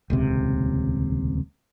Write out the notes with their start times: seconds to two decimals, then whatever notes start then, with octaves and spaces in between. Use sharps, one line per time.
0.10 D#1 C#2 C3